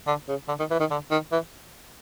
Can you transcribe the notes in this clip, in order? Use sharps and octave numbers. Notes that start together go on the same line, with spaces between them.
D3
C#3
D3
D#3
E3
D#3
D3
D#3
E3